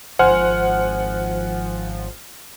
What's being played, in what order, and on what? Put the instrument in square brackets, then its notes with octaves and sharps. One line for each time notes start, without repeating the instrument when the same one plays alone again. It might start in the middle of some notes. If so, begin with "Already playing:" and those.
[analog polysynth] G#1 F3 [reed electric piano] C5 [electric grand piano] F#5 G#5 F6